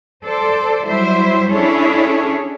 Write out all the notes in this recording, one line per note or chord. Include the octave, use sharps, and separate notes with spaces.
A4 C5 D5
F#3 G3 E4 C5 E5
C#4 D4 E4 G#4 A4 C#5